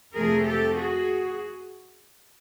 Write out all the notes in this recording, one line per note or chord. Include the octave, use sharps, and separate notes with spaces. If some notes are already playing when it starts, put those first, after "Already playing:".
F2 C3 F3 A3 G#4 A#4
G4 A4
F#4 G#4